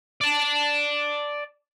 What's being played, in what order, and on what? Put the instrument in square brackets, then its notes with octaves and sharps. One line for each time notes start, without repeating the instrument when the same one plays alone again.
[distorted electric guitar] D5 A5